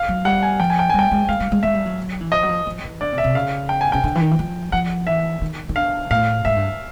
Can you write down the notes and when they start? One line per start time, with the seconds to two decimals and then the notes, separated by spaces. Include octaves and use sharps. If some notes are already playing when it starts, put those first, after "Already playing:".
Already playing: F5
0.08 F#3
0.25 G3 F#5
0.43 G#5
0.59 F3 G5
0.70 G#5
0.79 G5
0.90 G3 G#5
0.99 G5
1.12 G#3
1.28 G#3 F5
1.40 G3
1.52 G#3
1.63 G#3 E5
1.74 G3
1.86 F#3
2.21 E3
2.32 F3 D#5
2.43 F#3
2.49 F3
2.67 F3
2.83 E3
3.01 D3 D5
3.12 C3
3.18 E5
3.24 C3
3.35 C#3 F5
3.69 G5
3.81 G#5
3.92 C#3 G5
4.04 D3
4.15 E3
4.21 D#3
4.31 E3
4.39 F3
4.72 F3 F#5
5.07 E3 E5
5.41 D#3
5.69 D#3
5.76 D3 F5
6.10 A2 F5
6.45 G#2 E5
6.56 G2